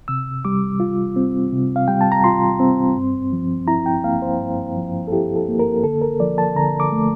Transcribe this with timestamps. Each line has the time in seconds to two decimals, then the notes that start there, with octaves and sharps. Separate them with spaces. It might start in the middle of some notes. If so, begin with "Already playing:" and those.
0.08 C3 E6
0.45 G3 D6
0.80 F4
1.16 C4
1.53 C3
1.76 F5
1.88 G3 G5
2.01 A5
2.12 A#5
2.24 F4 C6
2.60 C4
2.96 G2
3.33 F3
3.68 E4 A#5
3.86 G5
4.04 A#3 F5
4.22 C5
4.41 G2
4.76 F3
5.08 A4
5.12 E4 G4
5.36 A4
5.49 A#3
5.59 A#4
5.84 D3 A4
6.01 A#4
6.20 F3 D5
6.38 A5
6.56 D3 A#5
6.80 D6
6.92 A3